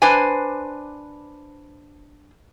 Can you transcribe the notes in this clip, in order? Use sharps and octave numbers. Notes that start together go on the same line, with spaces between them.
D4 B4 C5 G#5